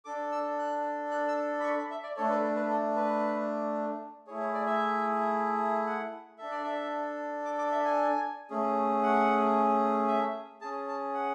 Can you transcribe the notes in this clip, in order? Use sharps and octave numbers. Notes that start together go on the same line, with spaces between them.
D4 A4 D6
E6
F#6
F#6
E6
B5
C#6
B5
E5
D5
A3 D4 A4 C#5
B4
A4
B4
A4
B4
A3 E4 G#4 C#5
C#5
D5
E5
F#5
D4 A4 E5
D5
E5
D6
D6
E5
G#5
A3 C#4 G#4
F#5
E5
C#4 G#4 A5
A5
F#5